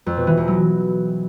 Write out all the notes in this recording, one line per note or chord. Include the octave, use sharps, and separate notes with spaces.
F2
B2
E3
E2
F#3